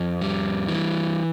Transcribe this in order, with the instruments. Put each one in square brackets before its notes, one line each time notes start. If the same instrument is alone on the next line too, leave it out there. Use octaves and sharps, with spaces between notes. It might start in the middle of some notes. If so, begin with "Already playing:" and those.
Already playing: [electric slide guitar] F2
G3
E3